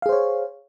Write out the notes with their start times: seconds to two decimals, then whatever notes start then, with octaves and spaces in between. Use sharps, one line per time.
0.02 F5
0.06 G#4
0.09 C5
0.12 C#5